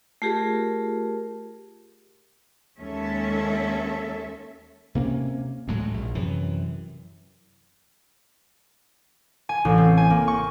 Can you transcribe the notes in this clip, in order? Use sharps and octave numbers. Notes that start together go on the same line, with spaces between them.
A3 F4 G4 G#4 A#4
D#2 G#3 A#3 C#4 A4 E5
C3 A#3 C4 C#4
D2 A2 F#3 G#3
A#1
F#2 C3 E3
G#5
A1
C4
G#5
A#3
C#6